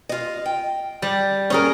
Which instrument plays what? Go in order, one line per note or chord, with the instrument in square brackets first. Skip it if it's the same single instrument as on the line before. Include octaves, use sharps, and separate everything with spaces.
[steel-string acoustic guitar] F4 D#5
G5
[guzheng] G3
[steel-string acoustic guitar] A#2 [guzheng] C#4 G#4 A#4